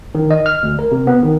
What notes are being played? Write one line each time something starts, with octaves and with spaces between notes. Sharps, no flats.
D#3
D#5
F6
D2
A#4
C3
B3
D#3